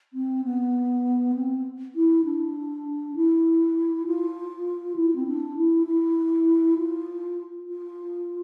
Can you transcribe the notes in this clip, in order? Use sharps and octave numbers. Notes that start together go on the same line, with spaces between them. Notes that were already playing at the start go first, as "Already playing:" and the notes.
C4
B3
C4
E4
D4
E4
F4
E4
C4
D4
E4
E4
F4
F4